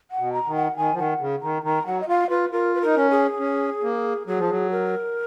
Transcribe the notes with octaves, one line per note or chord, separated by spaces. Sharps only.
F#5
B2
A#5
D#3
F#5
D#3 G#5
F3
D#3 F#5
C#3
D#3 A#5
D#3 A#5
F#3 F#5
D#5
F4 F5
F4 B4
F4 A#4
B4
D#4 A#4
C#4
G#4
C#4
A#3
F#3 G#4
F3
F#3
A#4